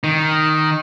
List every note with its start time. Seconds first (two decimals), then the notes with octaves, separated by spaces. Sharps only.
0.04 D#3